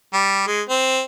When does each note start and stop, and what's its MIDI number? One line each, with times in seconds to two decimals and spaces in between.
0.14 0.43 55
0.47 0.62 56
0.69 1.02 60